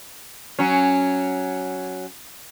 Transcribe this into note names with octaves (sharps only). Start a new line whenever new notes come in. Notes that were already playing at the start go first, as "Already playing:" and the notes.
F#3 C#4